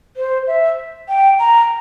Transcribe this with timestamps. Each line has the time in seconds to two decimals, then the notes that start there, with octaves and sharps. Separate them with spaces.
0.17 C5
0.47 E5
1.09 G5
1.39 A#5